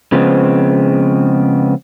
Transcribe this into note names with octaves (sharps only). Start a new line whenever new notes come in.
C#3 F3 G#3 B3 C4